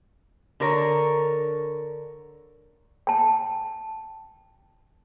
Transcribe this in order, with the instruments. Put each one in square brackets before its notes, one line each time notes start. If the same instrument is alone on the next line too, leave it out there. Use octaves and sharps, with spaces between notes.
[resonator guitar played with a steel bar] D3 A#4 C#5
[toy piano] G5 A5